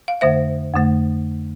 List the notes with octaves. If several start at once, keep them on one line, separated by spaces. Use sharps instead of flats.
F5
F2 D3 A3 C5 E5
F2 D3 A3